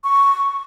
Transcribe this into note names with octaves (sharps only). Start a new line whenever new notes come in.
C#6